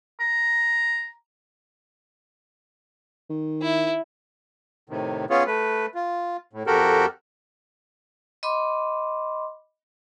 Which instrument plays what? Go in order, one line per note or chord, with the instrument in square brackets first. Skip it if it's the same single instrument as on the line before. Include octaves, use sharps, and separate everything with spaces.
[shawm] A#5
[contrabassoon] D#3
[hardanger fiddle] E4
[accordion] A2 C3 D#3
B3 C#4 F4 G#4 C#5
A3 B4
F4
A2
F2 F#4 G4 A4 A#4
[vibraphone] D#5 B5 C6 D6